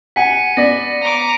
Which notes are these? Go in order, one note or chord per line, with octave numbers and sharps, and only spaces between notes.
F#5 G#5 B6 C#7 D#7
B3 D5 A#6 B6
A#5 D6